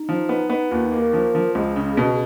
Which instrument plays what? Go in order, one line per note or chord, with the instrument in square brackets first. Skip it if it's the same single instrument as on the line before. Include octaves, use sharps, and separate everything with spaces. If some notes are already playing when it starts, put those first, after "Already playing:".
Already playing: [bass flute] D#4
[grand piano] F3
B3
B3
[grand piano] D#2 [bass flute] F4
[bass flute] D#4
[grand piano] A#3
[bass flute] A#4
[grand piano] F3
F3
[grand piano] C#2 [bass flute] G#4
[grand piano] C#3
B2